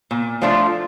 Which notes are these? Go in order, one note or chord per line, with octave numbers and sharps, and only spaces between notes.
A#2
F3 A3 D4 F4